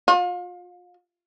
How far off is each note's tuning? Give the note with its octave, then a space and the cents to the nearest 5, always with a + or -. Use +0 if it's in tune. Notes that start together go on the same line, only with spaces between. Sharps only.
F4 +35